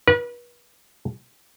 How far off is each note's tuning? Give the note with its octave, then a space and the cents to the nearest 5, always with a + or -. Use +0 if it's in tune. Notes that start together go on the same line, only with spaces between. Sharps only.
B4 -40